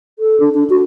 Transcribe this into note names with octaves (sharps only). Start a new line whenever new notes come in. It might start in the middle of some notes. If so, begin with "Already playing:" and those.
A4
D4
D4
F#4